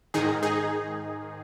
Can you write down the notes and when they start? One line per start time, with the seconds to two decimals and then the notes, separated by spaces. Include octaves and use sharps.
0.14 G#2 D#3 D#4 G#4
0.43 D#4 G#4